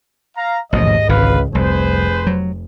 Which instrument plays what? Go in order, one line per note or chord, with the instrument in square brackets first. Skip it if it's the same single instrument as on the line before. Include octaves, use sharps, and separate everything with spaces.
[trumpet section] F5 A#5
[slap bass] A1 B2 F3 [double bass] D#2 G#2 [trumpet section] D#5
[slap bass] G#1 D3 [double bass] C#2 [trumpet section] B4 F5
[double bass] F1 [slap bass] C2 [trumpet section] G#4 B4 C5
[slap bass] F#3